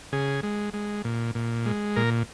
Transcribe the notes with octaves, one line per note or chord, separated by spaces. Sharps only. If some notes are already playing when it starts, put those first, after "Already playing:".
C#3 G#4
G#3
G#3
A#2
A#2
G#3
A#2 A#4